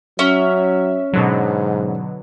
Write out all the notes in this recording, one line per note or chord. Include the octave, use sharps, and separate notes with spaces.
F#3 C#4 E5
G#2 B2 D3 F#3